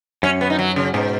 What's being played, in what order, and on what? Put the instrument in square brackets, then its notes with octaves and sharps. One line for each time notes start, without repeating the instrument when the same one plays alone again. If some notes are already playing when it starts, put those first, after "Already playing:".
[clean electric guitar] F#2 [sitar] C#4
[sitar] B3
D#4
F#3
C#3
[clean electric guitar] G#2 [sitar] B2